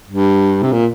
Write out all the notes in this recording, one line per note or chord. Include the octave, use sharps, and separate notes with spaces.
G2
C3
A#2